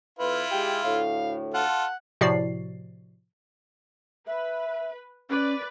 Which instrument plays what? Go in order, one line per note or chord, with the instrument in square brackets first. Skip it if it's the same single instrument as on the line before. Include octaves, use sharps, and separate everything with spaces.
[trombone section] F2 B4 [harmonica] E4 F4
[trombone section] G#3 G4 [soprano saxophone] G5
[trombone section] D2 A2 [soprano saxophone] F5
[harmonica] F4 A4 [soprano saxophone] F#5
[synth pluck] A2 C3 F3 F#4 D5 C7
[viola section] B4 [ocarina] E5
[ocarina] C#4 [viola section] B4 D5